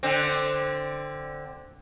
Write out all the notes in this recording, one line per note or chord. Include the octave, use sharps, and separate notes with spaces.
D3 C4